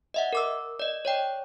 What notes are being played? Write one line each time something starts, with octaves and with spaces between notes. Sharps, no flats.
D#5 E5 F#5
A#4 D6 E6
D5 D#5
C#5 D5 G5